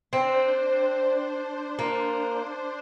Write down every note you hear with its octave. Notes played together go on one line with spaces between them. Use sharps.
C4 D4 C5
A#3